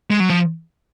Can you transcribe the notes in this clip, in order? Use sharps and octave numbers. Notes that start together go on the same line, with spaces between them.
G#3
F#3
F3